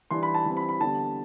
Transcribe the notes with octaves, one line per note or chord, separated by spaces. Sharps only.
E3 G3 D4 C6
B5
A5
E3 G3 C4
B5
B5
D3 G3 B3 D4 A5